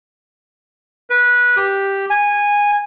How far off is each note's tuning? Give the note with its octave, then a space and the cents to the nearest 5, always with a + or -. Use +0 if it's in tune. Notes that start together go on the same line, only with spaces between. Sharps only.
B4 -15
G4 +0
G#5 -15